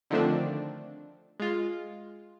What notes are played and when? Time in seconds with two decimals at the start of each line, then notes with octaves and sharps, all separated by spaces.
0.11 D3 D#3 F3 A3 C4 D4
1.40 G#3 F4